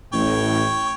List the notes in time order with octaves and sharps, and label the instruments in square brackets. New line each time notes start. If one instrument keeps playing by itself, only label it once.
[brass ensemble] A1 A2 [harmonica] C#5 G5